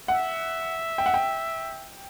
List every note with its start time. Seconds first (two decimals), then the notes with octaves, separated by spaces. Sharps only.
0.08 E5 F#5
0.98 G5
1.06 F#5
1.14 G5